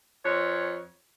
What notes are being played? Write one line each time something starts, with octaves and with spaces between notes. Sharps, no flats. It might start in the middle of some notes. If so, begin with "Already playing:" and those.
F2 C#5